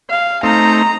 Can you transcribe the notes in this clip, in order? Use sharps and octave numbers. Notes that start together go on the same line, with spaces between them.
F5
A3 C4 D#4 A#5